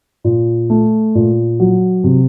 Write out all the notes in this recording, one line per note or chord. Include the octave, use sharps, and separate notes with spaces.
A#2
A3
A#2
F#3
C3